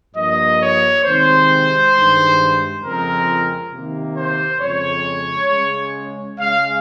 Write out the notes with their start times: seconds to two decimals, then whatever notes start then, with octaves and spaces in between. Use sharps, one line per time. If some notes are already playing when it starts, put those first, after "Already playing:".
0.15 G2 F3 A#3 D#5
0.60 C#5
1.04 C3 D#3 G#3 C4 C5
1.93 G2 D#3 G#3
2.82 F2 C#3 F3 G#3 C4 A#4
3.72 C3 D#3 A#3
4.17 C5
4.60 F2 C#3 G#3 C#5
5.50 C#3 G#3 C#4
6.39 C#3 G#3 C#4 F5